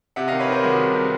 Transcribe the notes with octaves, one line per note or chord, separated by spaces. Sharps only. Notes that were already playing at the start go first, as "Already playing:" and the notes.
C3 E5 F#5
D#3 D#5 F5
B4 C#5
D#3 A#4 C5
C2 F#4 G#4
C3
C3